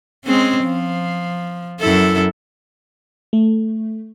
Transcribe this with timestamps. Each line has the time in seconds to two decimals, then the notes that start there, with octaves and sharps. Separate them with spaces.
0.24 G#3 C4 C#4
0.64 F3
1.80 F#2 E4 A4
3.33 A3